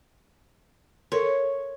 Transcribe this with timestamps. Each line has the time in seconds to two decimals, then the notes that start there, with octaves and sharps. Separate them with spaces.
1.12 A4 A#4 C#5 C6